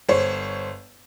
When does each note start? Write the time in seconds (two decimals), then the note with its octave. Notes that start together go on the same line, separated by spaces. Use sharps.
0.09 G1 C5 C#5